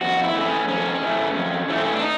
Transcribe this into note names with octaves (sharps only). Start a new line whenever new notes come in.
F2 F#4
E4
C#3 E3 A3
C#4
F2 C#4
C#3 E3 A3
F2
C#3 E3 A3
C4
C#4
D4
D#4